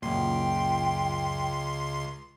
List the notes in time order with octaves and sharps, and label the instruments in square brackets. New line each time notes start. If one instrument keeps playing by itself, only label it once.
[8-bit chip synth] C#2 C6 [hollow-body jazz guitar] F#2 A#2 [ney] G5